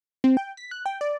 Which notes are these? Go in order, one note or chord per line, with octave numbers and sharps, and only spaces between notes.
C4
G5
B6
F#6
G5
D5